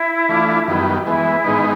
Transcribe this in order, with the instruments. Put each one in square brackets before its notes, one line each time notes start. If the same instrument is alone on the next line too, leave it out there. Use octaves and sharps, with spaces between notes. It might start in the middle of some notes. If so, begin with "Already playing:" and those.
Already playing: [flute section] E4
[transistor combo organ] E3 A3 D4 F4
F#2 D#3 G3 B3
[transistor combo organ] E3 G#3 B3 [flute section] E4
[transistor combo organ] G#2 D#3 G#3 B3 D#4